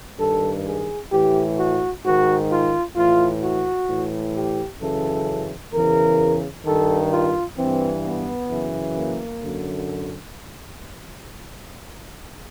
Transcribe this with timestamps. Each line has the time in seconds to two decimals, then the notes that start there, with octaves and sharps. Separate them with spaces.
0.18 G2 D#3 A4
0.65 G#4
1.11 A2 E3 G4
1.57 F#4
2.03 G#2 D#3 F#4
2.49 F4
2.96 A2 E3 F4
3.42 F#4
3.88 A2 E3
4.34 G4
4.81 F#2 C#3 E3 A4
5.73 E2 C#3 E3 A#4
6.65 G2 D#3 A4
7.11 F4
7.58 G2 E3 C4
8.04 B3
8.50 F#2 C#3 E3
8.96 A#3
9.42 F#2 D3